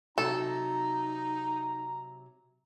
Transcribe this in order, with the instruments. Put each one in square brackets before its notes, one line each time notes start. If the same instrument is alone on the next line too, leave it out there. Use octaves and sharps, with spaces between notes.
[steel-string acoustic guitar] C3 F#3 [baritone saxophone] D#4 [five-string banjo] A4 [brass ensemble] A#5